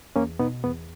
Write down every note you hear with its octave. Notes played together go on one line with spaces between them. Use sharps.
E2 A#3 C#4
B2 B3 D#4
E2 B3